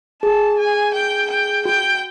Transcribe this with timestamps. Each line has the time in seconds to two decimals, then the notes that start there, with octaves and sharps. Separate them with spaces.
0.22 G#4 A5
0.59 G#5
0.93 G5
1.30 G5
1.65 F#4 G5